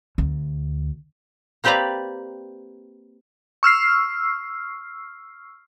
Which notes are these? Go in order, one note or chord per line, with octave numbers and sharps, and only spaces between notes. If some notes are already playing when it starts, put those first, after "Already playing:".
D2
A#3 C4 G4 B4 D5 A#5
C#6 E6 F6 C7